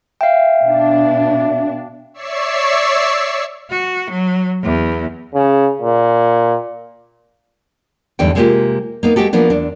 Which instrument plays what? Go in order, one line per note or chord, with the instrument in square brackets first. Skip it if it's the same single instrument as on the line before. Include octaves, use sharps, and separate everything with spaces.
[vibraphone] E5 [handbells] F5 G5
[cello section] B2 D4
[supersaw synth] C#5 D5 E5 C#6 E6 C7
[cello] F#4
F#3
E2
[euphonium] C#3
A#2
[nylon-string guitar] E2 G#2 D3 G3 G5
C3 G#3 A#3 D#4 F4 G4
A#3 B3 D#4
G#3 A3 F#4 G4 A4
F3 A#3 B3 D4
E2 D4